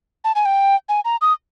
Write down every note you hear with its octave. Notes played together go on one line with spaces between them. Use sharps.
A5
G#5
G5
G#5
A#5
D#6